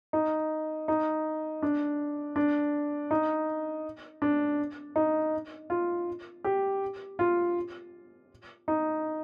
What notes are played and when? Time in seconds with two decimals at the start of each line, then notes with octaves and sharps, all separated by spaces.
0.13 D#4
0.88 D#4
1.62 D4
2.36 D4
3.11 D#4
4.22 D4
4.96 D#4
5.70 F4
6.44 G4
7.19 F4
8.68 D#4